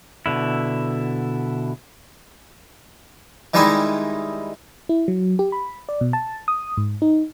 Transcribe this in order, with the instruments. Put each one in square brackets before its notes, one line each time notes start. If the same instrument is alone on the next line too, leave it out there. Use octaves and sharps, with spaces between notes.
[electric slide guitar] B2 D3 E4
[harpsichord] D#3 E3 G3 G#3 D#4 E4
[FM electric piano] E4
F#3
G4
B5
D5
B2
A5
D#6
G#2
D#4